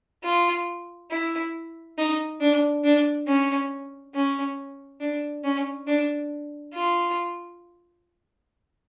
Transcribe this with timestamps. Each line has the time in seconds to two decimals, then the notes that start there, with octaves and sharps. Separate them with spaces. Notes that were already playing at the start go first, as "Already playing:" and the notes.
0.24 F4
1.11 E4
1.98 D#4
2.40 D4
2.84 D4
3.27 C#4
4.14 C#4
5.00 D4
5.44 C#4
5.87 D4
6.74 F4